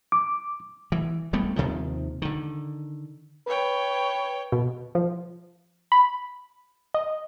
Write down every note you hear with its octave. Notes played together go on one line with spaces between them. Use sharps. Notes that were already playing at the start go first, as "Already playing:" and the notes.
D6
E3
D2 G3 A3 B3
D#2 C3 D#3 F3
D3 D#3
B4 C#5 G5
B2
F3
B5
D#5